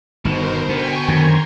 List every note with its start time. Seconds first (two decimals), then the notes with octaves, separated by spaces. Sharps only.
0.25 G1 B2 D#3 A#4 C5
0.69 B2 D3 B3 G5 G#5 C#6
1.08 F#2 D3 D#3 A#5 C6 G#6